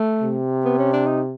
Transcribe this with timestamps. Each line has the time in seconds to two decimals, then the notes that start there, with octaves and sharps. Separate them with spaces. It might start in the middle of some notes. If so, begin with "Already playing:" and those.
Already playing: A3
0.22 C3
0.65 B3
0.79 C#4
0.93 D4
1.06 D#4